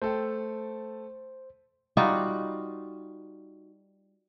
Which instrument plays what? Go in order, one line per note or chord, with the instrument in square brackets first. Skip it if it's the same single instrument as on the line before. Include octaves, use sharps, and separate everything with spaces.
[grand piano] A3 A4 G5 [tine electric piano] C5
[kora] G3 D#4 F4 F#4